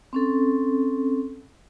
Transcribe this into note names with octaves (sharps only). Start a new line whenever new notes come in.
C4 C#4 A4